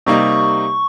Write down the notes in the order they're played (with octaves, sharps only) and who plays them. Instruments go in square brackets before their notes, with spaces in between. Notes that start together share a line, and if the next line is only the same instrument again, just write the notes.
[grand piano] C3 G3 A#3 D#4 [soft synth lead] C#6